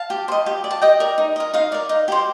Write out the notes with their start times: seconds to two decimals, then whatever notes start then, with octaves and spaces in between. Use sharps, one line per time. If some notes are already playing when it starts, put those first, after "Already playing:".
Already playing: F5 A5
0.10 G4
0.28 C5
0.32 D#5
0.46 G4
0.64 D5
0.71 A5
0.81 G4 D#5 G5
1.00 A#4 D5
1.18 D#4
1.36 A#4 D#5
1.54 D#4 F5
1.72 A#4 D5
1.89 D#4
2.08 G4 C5